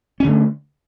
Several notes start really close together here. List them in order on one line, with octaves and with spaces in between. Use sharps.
C#4 D3 A3